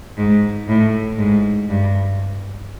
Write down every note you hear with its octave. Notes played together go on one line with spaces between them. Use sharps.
G#2
A2
G#2
G2